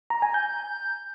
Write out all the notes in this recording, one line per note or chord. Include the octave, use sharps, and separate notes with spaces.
A#5
G#5
G6